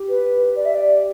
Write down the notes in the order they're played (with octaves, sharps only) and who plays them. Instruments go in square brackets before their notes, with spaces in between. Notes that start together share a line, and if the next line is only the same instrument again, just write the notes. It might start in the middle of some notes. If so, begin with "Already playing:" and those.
Already playing: [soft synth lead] G4
[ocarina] B4
D5
E5
D5